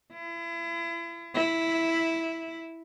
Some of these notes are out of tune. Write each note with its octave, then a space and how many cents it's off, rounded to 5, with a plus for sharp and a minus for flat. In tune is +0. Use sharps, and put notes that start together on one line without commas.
E4 +35
E4 -5